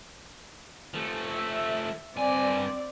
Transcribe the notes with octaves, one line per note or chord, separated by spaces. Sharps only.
F3 A3
E5
G2 C4 D5 G#5